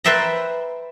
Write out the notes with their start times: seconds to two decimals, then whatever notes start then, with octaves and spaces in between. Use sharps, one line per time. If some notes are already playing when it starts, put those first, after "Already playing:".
0.04 B4 C5 D5 E5 G5 A#5